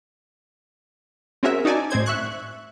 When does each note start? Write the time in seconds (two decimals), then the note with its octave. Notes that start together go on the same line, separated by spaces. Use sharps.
1.43 C4 C#4 F#4 G#4 A#4 E5
1.65 D#4 F#4 D5 G#5 A5
1.90 A2 C4 C5 G#6
2.06 E5 C#6 F#6